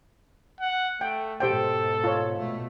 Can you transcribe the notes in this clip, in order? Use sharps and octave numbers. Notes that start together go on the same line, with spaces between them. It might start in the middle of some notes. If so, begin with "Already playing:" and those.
F#5
A3 G5
G#2 B2 G4 A4 C5 G5
F4 C#5
B2 A3